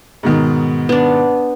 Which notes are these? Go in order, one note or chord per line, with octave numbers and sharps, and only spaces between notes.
G#2 B2 D#3
B3 D4